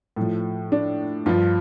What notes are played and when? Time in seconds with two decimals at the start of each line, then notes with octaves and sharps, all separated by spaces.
0.16 A2 F3
0.72 D4
1.26 G2 F3 F4